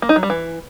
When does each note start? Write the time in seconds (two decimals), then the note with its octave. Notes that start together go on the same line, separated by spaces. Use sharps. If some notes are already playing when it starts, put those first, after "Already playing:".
0.02 A#3
0.09 D#4
0.16 F#3
0.23 G3
0.30 E3